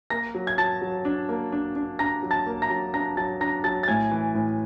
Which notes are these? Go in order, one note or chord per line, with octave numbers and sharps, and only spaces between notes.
A#3 A#5 A#6
F#3
G#6
F#3 A5 A6
F#3
D4
A#3
D4
D4
D4 A#5 A#6
F#3
A5 A6
A#3
A#5 A#6
F#3
D4 A#5 A#6
F#3 A5 A6
D4 A#5 A#6
F#3 A5 A6
A6
A2 G#5 G#6
E3
A2